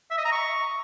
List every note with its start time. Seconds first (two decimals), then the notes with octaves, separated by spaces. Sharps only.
0.11 E5
0.18 D#5
0.25 A#5
0.32 C#6